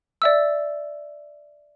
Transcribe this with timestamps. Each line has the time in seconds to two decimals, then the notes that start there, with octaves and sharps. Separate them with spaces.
0.22 D5 E5 E6